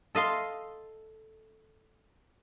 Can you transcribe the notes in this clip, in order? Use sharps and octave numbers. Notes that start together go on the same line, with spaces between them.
A4 D#5 F5 C6